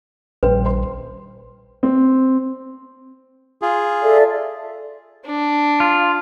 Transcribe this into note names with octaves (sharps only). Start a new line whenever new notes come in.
D#1 A#1 B4 C5 G5
C5 C6
C4
F4 G#4
A4 D5 E5
D4
F4